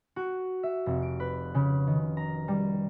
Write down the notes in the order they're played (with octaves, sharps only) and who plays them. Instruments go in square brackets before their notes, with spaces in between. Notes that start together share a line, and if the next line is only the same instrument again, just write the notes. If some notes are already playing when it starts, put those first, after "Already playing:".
[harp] F#4
E5
F1
D7
B4
C#3
D#3
A#5
G3